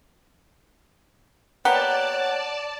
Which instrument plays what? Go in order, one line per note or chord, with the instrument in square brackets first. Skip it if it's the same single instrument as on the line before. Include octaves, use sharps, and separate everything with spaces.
[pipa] A#3 B3 G4 [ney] C#5 [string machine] D5 A5 [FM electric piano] F#5